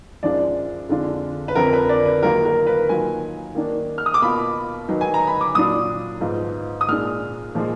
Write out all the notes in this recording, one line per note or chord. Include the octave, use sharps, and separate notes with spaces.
F#2 F3 G#3 D4 F4 D5
F2 D3 G#3 D4 F4
B4
F2 D3 F3 A#4
B4
D5
B4
D#3 F#3 A#3 F4 A#4
A#4
B4
D#3 F#3 A#3 F4 G#5
D#3 A#3 D4
F6
D#6
D6
B2 A#3 F4 B5
D#3 F#3 B3 D#4
G#5
A#5
B5
D6
A#2 F#3 D4 F4 D#6
G#2 F3 B3 F4
D#6
A#2 G#3 D4 F6
A#2 F3 G#3